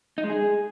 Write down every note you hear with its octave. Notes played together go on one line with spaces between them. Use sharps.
D#4
G#3
G#4